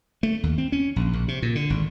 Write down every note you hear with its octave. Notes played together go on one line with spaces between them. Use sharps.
A3
D#2
C4
C#4
A#1
A#1
C3
A#2
D3
G#1